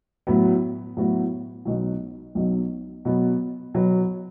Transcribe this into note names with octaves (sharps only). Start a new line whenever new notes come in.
A2 F#3 B3 F#4
A2 F#3 B3 F#4
B1 B2 F#3
B1 B2 F#3
B2 F#3 B3
B2 F#3 B3